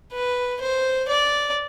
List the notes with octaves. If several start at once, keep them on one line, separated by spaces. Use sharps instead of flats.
B4
C5
D5